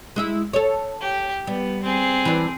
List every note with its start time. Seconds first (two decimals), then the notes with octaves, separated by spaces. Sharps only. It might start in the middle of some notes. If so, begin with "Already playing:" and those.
0.16 G#3 E4 E5
0.53 A4 C#5
1.01 G4
1.47 G3 B3
1.84 C4 G#4
2.25 E3 D4